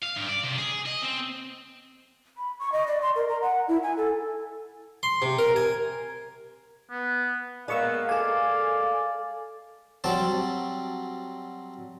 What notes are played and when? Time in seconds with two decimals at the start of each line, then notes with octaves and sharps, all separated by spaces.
0.03 F5
0.17 G2
0.29 D5
0.44 C3
0.58 G#4
0.86 D#5
1.02 C4
2.37 B5
2.60 C#6
2.72 D#5
2.87 D5
3.02 C6
3.16 A#4
3.28 A#5
3.41 F#5
3.68 E4
3.83 G#5
3.97 A4
5.03 C6
5.22 C3
5.39 A#4
5.56 G#5
6.90 B3
7.68 G#3 A#3 B3 D5 F5 C#6 E6
8.09 A4 D5 G#5
10.04 F#3 G3 C4 A5